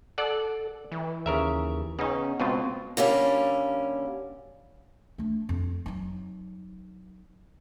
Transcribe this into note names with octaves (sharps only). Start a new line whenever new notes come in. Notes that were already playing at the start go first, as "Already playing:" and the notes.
A4 D5 F#5
E3
D#2 C#3 A#4 E5
C#3 B3 C#4 D#4
C#2 B2 C4 F4
D3 G3 A#3 C#4
A3 D4
F2
F#3 D#4